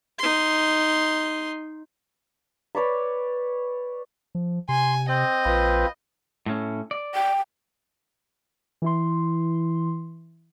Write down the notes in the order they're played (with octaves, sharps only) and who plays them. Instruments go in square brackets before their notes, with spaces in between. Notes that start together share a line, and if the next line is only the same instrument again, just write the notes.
[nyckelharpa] D#4 C6
[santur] B4 C#5 D5 B5
[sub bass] F3
[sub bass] C3 [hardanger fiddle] G#5 [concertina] C6
[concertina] C4 [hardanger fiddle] D#5
[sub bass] A#1 [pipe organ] F4 B4
[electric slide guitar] A2 A3 C#4
D5
[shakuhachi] G5
[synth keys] E3 E4 C6